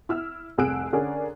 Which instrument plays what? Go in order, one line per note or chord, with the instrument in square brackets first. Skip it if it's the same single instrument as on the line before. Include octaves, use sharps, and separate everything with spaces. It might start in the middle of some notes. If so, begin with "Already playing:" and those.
[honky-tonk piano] E4 E6 F6
F1 C2 G#4 E6 F#6 D7
D3 C#4 G#4 A#4 D5